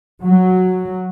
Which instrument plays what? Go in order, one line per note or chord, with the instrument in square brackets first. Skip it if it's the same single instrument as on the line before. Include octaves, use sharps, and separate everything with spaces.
[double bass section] F#3